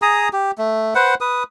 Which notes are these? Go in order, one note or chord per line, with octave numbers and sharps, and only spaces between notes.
G#4 A#5 D#6
G4
A3
B4 C5 F#5
B4 D#6